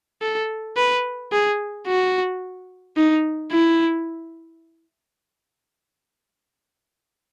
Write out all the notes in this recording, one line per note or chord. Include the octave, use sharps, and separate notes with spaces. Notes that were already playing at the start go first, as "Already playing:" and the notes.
A4
B4
G#4
F#4
D#4
E4